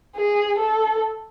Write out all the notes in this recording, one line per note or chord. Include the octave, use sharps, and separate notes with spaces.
G#4
A4